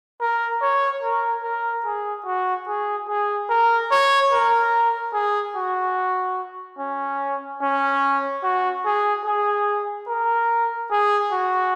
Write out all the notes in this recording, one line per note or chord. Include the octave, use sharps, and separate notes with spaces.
A#4
C#5
A#4
A#4
G#4
F#4
G#4
G#4
A#4
C#5
A#4
G#4
F#4
C#4
C#4
F#4
G#4
G#4
A#4
G#4
F#4